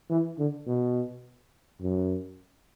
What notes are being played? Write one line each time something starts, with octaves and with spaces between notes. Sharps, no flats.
E3
D3
B2
F#2